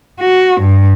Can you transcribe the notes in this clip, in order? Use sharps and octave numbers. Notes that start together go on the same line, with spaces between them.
F#4
G2